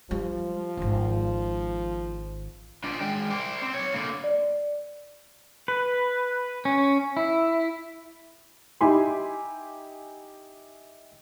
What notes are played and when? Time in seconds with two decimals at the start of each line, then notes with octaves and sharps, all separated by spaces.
0.11 F3 G3
0.77 D#1 G#1
2.84 F3 D4
3.01 G#3 G5
3.30 C5 D5
3.62 C4
3.74 B1 C#5
3.94 D3 A#3
4.24 D5
5.68 B4
6.65 C#4
7.17 E4
8.81 D#4 E4 G4 G#5 B5 C6